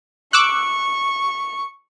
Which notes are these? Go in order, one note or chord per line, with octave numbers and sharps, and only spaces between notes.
C#6 D6 E6 F#6